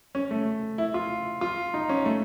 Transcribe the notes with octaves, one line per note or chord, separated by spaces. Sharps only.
C#4
A3
E4
F4
F4
D#4
C#4
A3